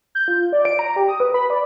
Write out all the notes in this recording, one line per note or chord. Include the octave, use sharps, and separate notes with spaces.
G6
F4
D5
D7
A#5
G4
D#6
B4
B5
D5